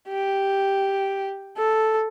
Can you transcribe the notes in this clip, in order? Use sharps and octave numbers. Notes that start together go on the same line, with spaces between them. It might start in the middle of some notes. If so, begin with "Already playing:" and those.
G4
A4